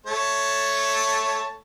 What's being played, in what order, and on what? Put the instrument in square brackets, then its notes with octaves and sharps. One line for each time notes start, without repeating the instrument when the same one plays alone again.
[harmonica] A3 C#5 A5